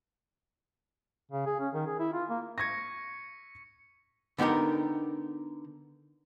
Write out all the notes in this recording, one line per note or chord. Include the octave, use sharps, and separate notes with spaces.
C#3
G#4
C#4
D#3
G#4
E4
F4
A#3
C#6 G#6 A#6 B6 C#7
D3 B3 D#4 G4 A#4